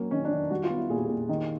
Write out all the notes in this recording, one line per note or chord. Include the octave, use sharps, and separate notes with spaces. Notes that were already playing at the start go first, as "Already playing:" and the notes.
Already playing: F#3 A#3 C#4
D#3 C#4
D4
D#3
G3 F#4
F4
B3
E4
A#2 G#4
G4
A#2 G#4
D#3